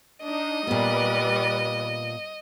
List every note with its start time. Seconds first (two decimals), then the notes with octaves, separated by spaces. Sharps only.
0.23 D4 D#4 D#5
0.67 A#2 G3 B3 B4 D5